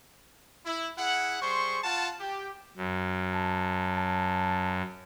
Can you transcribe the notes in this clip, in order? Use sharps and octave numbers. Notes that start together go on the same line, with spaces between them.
E4
E4 G#4 F#5
G3 G#4 C5 C6 C#6
F4 F#5 A5
G4
F#2
A5
A5